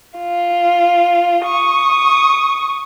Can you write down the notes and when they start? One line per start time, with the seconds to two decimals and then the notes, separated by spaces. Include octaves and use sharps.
0.18 F4
1.45 C#6 D#6